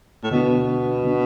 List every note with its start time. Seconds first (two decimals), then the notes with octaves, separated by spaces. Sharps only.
0.24 A2
0.31 D2 B2 D3 B3 D4
1.04 D3 B3 D4